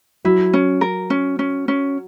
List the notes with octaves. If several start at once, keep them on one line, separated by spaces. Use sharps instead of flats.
F#3 E4
C#4
A#4
C#4
C#4
C#4